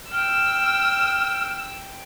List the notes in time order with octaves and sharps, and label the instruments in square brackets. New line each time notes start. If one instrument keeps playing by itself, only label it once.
[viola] G5 [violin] E6 [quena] F6